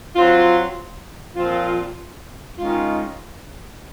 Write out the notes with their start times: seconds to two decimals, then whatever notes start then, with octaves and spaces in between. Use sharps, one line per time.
0.14 F#3 C4 F4
1.35 A#2 F3 C4 F4
2.57 D#3 G#3 C#4 F4